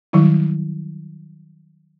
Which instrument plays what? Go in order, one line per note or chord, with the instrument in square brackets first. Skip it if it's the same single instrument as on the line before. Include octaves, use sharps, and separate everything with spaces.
[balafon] D#3 F#3 G3 E4